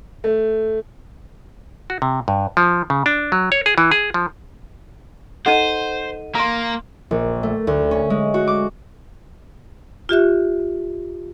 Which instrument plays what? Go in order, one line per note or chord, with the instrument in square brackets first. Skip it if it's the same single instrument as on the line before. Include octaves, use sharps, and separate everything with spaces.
[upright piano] A3
[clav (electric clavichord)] F#4
C3
G2
F3
C#3
D4
F#3
C#5
G#4
E3
G#4
F3
[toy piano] D#4 F#5 [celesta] A4 D#5 D#7 [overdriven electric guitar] C5
[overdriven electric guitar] A#3 [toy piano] A#5 C6
[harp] A#1
A3
D2
C#4
G#3
F#4
D6
[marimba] F4 G4 E5 F#6